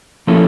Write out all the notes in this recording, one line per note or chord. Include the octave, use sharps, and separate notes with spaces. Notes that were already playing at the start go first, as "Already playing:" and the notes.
F3 A#3 C#4 E4 A4